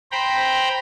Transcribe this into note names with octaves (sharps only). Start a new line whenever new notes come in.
C5 G5 A#5 B5